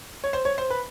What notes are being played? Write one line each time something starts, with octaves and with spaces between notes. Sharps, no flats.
C#5
C5
C#5
C5
B4